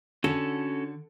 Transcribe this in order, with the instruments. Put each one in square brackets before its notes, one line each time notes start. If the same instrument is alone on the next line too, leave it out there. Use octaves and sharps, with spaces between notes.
[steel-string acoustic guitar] D3 [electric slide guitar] C#4 F#4 A4